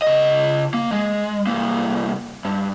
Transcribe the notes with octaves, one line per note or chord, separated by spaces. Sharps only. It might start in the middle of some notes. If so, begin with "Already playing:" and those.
C#3 D#5
A#3
G#3
C2 A#3
G2